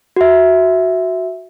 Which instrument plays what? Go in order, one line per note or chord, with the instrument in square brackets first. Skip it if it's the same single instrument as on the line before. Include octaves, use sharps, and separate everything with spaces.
[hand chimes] F#4 E5